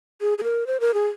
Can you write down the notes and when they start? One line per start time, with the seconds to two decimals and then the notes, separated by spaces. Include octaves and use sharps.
0.21 G#4
0.38 G#4
0.44 A#4
0.67 C5
0.80 A#4
0.94 G#4